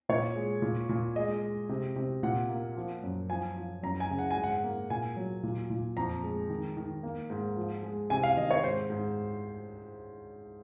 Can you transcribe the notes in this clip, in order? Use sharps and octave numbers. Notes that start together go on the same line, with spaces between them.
A#2 C#5
G#3
A#2
A#2
G#3 D#5
G#3
C3
C3
A#2 F#5
A#3
F3
F#2
F3 G#5
F3
F#2 A#5
G#5
C#3
F#5
G#5
G#2
F#5
A#3
A#2 G#5
F#3
A#2
A#2
F2 A#5
G#3
D#3
D#3
A#3
G#2
F3
G#3
C3 G#5
F5
D#3 D#5
C#5
G#2 C5
G#2